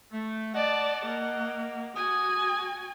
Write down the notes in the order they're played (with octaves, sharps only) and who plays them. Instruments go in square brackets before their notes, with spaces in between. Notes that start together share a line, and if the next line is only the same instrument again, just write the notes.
[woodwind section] A3
[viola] D5 A5 [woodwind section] D#5 F#5
[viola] A#3
[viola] F#4 G#5 [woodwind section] D#6